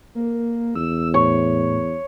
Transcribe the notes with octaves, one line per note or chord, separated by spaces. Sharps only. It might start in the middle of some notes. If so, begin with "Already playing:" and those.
A#3
E2 E6
A2 C#5